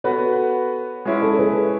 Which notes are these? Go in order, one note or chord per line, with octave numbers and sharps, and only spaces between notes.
B3 F#4 A4 B4 C#5
G#3 C#4 E4
A4 C#5
G#4 B4